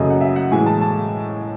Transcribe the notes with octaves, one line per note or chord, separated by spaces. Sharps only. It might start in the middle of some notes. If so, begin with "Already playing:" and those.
Already playing: F#2 C#3 F#3 A3 D#5
F#5
E5
F#5
A2 E3 G#3 G#5
A5
A5